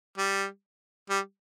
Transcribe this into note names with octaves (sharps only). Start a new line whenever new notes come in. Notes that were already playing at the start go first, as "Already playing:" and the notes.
G3
G3